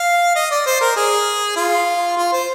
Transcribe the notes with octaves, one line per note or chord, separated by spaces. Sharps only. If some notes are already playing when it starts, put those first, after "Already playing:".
Already playing: F5
D#5
D5
C5
A#4
G#4
F4
F4
C5